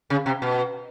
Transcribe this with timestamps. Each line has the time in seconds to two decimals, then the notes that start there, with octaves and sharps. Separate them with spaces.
0.10 C#3
0.26 C3
0.42 B2